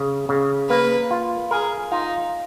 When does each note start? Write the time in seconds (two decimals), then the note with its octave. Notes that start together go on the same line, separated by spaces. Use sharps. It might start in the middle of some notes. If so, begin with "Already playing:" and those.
Already playing: C#3
0.29 C#3
0.70 A#3 B4
1.11 F4
1.51 G#4 A#4
1.91 D#4 F4